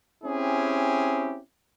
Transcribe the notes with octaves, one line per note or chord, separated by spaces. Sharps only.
C4 C#4 E4 G4 G#4